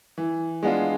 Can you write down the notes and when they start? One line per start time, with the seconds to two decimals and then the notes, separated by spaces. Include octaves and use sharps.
0.18 E3
0.63 G#3 B3 D4 F4